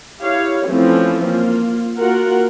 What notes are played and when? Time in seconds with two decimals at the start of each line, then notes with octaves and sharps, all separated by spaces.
0.21 E4 G4 C#5 F5
0.68 E3 F3 A3 C4 C#4 E4
1.25 A#3 F4
1.98 A#3 F4 F#4 A#4 F#5